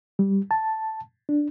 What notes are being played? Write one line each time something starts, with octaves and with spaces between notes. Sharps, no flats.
G3
A5
D4